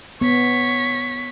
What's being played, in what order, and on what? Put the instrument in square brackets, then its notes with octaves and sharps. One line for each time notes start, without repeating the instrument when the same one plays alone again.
[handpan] B3 [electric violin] C#5 B6